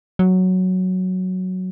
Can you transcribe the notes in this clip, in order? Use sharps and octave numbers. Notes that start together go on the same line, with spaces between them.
F#3